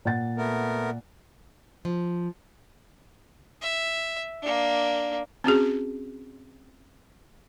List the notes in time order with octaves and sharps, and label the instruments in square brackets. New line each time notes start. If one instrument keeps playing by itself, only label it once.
[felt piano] A#2 F#5 A6
[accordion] A3 B3 A#4
[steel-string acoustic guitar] F3
[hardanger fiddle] E5
A#3 D4
[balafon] C4 C#4 F#4 G#4